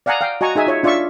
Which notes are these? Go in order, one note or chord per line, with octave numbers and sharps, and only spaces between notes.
D5 F5 F#5 G#5 A#5 D#6
F5 G5
F#4 D#5 G#5 A#5 C#6
D#4 G#4 E5 G#5
F4 C#5 E5
D4 F4 D5 E5 C#6